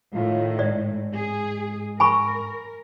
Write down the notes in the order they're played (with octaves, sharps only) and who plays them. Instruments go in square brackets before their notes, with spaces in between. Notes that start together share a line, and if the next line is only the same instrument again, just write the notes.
[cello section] A2 D#3 [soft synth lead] F4
[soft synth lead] G#2 [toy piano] D5
[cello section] G#4
[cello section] A#4 [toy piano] G#5 B5 C#6